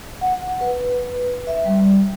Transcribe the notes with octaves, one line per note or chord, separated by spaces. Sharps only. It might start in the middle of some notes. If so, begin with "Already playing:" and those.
F#5
B4
E5
G3